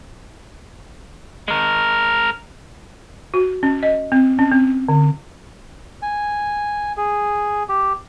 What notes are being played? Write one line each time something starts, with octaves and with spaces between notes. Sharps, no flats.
G#3 A#4
F#4
C#4
D#5
C4
C#4
C4
D3
G#5
G#4
G4